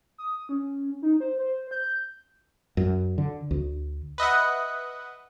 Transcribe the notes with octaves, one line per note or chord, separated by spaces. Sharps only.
D#6
C#4
D#4
C5
C5
G6
F#2
D3
D2
B4 D#5 E5 F#5